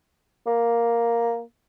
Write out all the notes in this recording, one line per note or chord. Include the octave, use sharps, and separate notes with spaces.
A#3